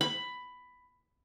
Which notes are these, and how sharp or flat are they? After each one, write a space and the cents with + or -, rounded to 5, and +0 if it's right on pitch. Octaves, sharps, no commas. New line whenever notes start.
B5 +10